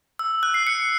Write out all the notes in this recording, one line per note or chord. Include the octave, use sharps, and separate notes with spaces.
E6
F#6
C7
C#7